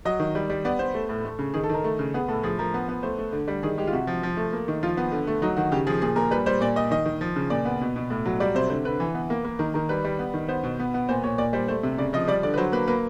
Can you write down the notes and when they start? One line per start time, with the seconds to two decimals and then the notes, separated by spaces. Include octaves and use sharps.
0.05 F#3 D#5
0.20 D#3
0.35 G3
0.50 G3
0.65 B3 D5
0.79 B3 C5
0.94 A3
1.09 A2
1.25 A3
1.39 C#3
1.54 D#3 G#4
1.63 A4
1.69 D#3 A#4
1.84 A3
1.99 C#3
2.14 B3 G#4
2.28 A2 A4
2.43 F3 G#4
2.59 F3 A#4
2.74 B3
2.89 B3
3.03 A3 C5
3.18 A3
3.33 D3
3.48 G3
3.63 D#3 G#4
3.77 G#3 G4
3.87 F4
3.93 C3 F#4
4.07 F3
4.23 F3
4.37 A3
4.53 A#3
4.68 D#3
4.83 F3 F4
4.97 B3
5.12 D3
5.27 A3
5.42 F#3 D#4
5.57 D#3 F#4
5.71 C#3 G4
5.87 F3 G#4
6.02 A#2 G#4
6.16 A#2 A#4
6.31 G3 B4
6.46 G3 C5
6.61 A#2 D5
6.76 A#2 D#5
6.91 D#3 D#5
7.05 D#3
7.21 F3
7.36 C#3
7.50 A#2 D5
7.65 B3
7.81 B2
7.96 B2
8.10 A2
8.25 F#3
8.40 G3 D5
8.55 C3 C5
8.70 D3 C5
8.85 D3 B4
9.00 E3
9.14 B3
9.30 A#3
9.45 A#3
9.59 D#3 A#4
9.74 D#3 A#4
9.89 G3 B4
10.05 G3
10.19 B3
10.34 D#3
10.49 B3 C5
10.63 B2
10.80 B3
10.94 B3
11.09 A#2 C5
11.23 A#2 C#5
11.38 A#2 D5
11.53 G3 C5
11.68 A3 C5
11.83 C3
11.98 C#3 D5
12.13 F3 D#5
12.28 G3 D5
12.43 D3 D5
12.54 B4
12.57 F#3 C5
12.72 A#3 B4
12.87 A#3 B4